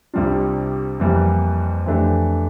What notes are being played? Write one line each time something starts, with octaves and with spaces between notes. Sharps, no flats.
C2 C3 G3 D4 F4
F2 E3 G3 A#3
F2 E3 A3 D4 G4